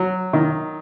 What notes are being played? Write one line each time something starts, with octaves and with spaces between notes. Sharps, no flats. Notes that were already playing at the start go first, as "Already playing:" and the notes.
Already playing: F#3
D#3